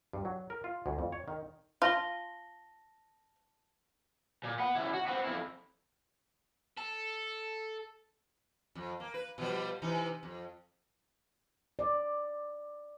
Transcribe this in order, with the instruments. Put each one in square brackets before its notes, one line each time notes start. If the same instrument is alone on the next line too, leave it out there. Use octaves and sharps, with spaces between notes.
[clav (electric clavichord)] G2
F#3
A#4
F4
D2
F2
C#5
D#3
[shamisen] F4 [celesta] A5 A#6 G7
[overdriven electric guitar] A#2
F#5 B5
C#3 E4
F#4
B3 C4
F2 E4
A4
[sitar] F2
A#3
B4
B2 F3 G3
C3 E3 D#4
F2
[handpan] D5